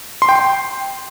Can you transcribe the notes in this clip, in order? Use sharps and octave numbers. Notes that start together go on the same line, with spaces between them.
C6
G5
C6